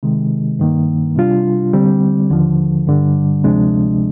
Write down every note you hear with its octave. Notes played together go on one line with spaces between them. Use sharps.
C3 D#3 G#3
G2 D#3 A#3
C3 G3 D4 F4
D3 G3 C4
D#2 D3 F3
G2 D3 G3
D2 C3 F3 G#3 D4